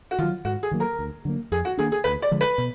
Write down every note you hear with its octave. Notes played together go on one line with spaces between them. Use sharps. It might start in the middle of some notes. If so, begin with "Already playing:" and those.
F#4
D#3 F#3 F4
G#2 F#4
G#4
D#3 F#3 A#3
A#4
D2
D3 F#3 A#3
F2 G#4
F#4
D#3 A#3 D4 G#4
G#4
D2 B4
D5
D3 F3 G#3
B4
B2